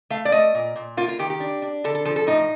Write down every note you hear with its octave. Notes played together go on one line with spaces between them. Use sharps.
A3 F5
D5
A3 D#5
A#2
A#2
A#3 F4
F4
D#3 G4
G4
D4
D4
D3 A4
A4
F3 A4
A4
A2 D#4